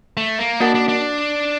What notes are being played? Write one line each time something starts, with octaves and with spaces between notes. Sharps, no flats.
A3
A#3
A#3 D4 F#4 A#4 F#5 A5
D4
D4